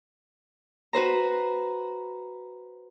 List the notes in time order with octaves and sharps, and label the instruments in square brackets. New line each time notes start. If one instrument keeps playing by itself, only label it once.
[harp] F#4 B4 C5 A#5